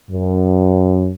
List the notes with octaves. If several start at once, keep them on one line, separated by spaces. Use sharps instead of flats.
F#2